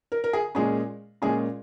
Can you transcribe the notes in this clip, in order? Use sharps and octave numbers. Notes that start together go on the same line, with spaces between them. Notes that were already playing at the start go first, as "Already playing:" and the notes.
A#4
A#4
G#4
A#2 G#3 C#4 G#4
A#2 G#3 C#4 G#4